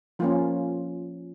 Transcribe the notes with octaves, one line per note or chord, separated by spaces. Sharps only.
F3 A#3 C#4 F4